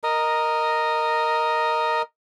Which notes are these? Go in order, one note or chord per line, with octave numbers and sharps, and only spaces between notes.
A#4 D#5